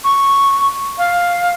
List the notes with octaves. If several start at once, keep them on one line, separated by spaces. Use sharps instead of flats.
C#6
F5